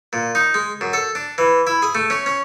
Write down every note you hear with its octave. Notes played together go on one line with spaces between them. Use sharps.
A#2
D#4
G#3
F#2
A4
D4
E3
E4
G#4
A3
C#4
C#4